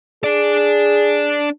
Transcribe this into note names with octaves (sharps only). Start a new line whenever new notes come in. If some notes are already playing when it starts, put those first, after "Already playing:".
D4 G#4 D5